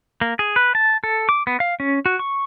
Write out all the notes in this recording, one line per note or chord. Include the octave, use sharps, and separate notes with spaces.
A#3
G#4
B4
A5
A4
D6
B3
F5
C#4
F#4
C#6